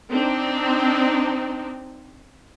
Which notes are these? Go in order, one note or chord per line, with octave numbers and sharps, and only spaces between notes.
C4 D4 D#4